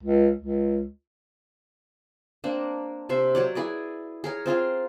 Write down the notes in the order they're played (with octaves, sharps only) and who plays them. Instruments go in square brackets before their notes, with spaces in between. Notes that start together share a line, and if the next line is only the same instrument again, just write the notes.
[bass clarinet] C#2
C#2
[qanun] A#3 C4 D4
C3 C5 E5
F#3 C#5 D5
E4 G#4 B4 D5
G#4 A#4 C#5
C4 F4 G#4 F5